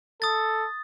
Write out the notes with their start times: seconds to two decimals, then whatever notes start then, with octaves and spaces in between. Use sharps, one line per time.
0.22 A4 D#6 A6